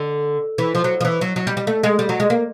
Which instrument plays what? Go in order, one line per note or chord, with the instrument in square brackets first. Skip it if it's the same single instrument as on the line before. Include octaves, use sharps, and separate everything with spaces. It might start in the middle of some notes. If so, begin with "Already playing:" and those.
Already playing: [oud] D3
E3
F3
F#3
F3
E3
F#3
F#3
G3
G3
A3
G#3
G3
F#3
G#3
A#3